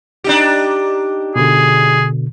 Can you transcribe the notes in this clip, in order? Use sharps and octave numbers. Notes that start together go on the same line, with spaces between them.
D4 D#4 G4
B2 D3 G#4